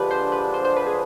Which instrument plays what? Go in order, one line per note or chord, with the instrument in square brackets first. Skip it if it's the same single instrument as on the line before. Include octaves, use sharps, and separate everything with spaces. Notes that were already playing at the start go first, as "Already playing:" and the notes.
Already playing: [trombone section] D3 F3 G#3 D4 [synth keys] G4 B4
[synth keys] C5
B4
C5
C5
B4
G#4